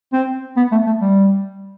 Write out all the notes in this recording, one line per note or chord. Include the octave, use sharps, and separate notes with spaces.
C4
B3
A3
A3
G3